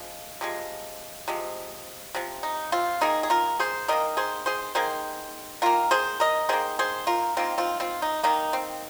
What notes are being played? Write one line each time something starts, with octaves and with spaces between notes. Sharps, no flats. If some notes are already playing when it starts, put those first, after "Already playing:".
Already playing: F3 G#3
C3 F3 G#3
C3 F3 G#3
C3 F3
D#4
C4 F4
D#3 A#3 D#4 G#4
G#4
F4 A#4
G#4 C5
D#3 A#3 A#4 D#5
G#4 C5
G#4 C5
D#3 A#3 G#4 C5
D#3 A#3 F4 A#4
G#4 C5
A#4 D#5
D#3 A#3 G#4 C5
G#4 C5
F4 A#4
D#3 A#3 C4 F4
C4 F4
C4 F4
D#4
D#3 A#3 D#4
C4